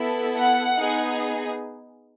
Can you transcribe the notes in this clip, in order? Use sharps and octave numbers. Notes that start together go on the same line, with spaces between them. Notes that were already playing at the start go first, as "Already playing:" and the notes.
Already playing: B3 E4 A4
F#5
B3 D#4 G#4